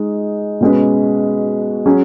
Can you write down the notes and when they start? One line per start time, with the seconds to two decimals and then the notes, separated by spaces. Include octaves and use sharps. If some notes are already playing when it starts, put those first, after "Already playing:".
Already playing: G#3 D#4
0.61 B2 G#3 C#4 B4
1.86 F#3 C#4 G#4